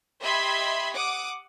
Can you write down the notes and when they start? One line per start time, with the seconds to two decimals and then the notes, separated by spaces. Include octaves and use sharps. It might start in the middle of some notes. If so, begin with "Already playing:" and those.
0.23 G4 D#5 E5 B5 C6 G#6
0.92 F#5 D6 D#6